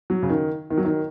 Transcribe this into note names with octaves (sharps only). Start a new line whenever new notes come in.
F#3
C#3
D#3
D#3
F#3
D#3